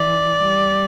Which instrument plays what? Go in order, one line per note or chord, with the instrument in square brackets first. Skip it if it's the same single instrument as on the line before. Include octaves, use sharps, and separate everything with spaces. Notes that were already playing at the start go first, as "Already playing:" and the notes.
Already playing: [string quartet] E3 [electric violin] D5
[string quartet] G3